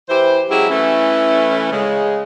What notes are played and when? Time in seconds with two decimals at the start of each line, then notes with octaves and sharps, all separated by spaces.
0.09 E3 E4 G4 C5
0.50 F#3 G#3 C#4 E4 G4 G#4
0.69 E3 A3 C#4
1.71 C#3 G#3